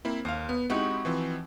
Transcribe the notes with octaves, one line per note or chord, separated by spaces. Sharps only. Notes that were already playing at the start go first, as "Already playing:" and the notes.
A#3 C4 E4
D#2 C5 F5
B3
G#3 C4 D#4 E4 F#4 G4
E3 F3 C4